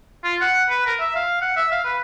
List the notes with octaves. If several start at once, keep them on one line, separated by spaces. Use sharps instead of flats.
F4
F#5
B4
A#4
E5
F5
F#5
E5
F5
B4